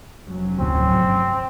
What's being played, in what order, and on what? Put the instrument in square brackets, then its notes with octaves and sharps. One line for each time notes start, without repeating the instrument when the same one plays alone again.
[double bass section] F1 F#3 C#4
[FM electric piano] D2 A2 [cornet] C4
[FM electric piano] G1